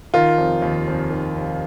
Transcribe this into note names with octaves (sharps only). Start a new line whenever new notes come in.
D#3 F4
F1
D#2
F1
D#3
F1